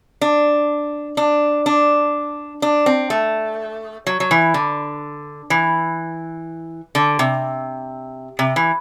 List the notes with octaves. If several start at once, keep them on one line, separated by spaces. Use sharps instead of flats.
D4
D4
D4
D4
C4
A3
F#3
F#3
E3
D3
E3
D3
C3
C3
E3